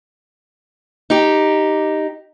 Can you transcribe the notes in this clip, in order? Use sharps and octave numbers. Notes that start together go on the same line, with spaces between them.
D#4 G4